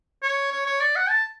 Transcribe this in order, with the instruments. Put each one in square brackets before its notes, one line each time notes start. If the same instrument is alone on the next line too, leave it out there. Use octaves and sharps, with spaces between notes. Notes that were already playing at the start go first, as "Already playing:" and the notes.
[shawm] C#5
C#5
C#5
D5
F#5
A5